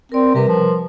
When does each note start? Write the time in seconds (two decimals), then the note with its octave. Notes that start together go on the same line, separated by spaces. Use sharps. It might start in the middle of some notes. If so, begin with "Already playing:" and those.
0.12 C4 A#4 D5
0.34 C3 G3 A#4 B4
0.48 F3